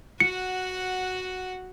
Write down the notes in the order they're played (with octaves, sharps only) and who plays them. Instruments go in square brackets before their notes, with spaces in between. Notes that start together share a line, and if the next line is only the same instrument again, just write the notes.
[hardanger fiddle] F#4 F#5 [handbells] C#7